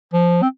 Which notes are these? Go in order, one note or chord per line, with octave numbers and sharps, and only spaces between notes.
F3
C4